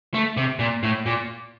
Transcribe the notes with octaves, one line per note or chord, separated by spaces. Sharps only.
A3
C3
A#2
A2
A#2